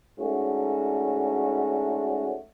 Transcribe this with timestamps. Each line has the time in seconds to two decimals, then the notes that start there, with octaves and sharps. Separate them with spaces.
0.20 G#2 A3 C#4 D4 F#4